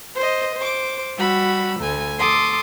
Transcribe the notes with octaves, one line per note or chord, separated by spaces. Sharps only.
C5 D#5
C5 D6
G3 F#4 B5 E6
D2 A3 G#5
A4 C6 D6 D#6